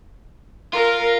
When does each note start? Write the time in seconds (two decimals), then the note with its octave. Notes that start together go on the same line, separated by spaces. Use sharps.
0.73 F4 A#4